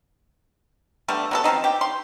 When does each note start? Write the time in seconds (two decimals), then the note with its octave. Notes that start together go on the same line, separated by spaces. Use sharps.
1.08 D3 G3 A3 B3
1.31 F#3 B3 A4
1.44 F3 F#3 C4 D#4
1.64 G4
1.81 C6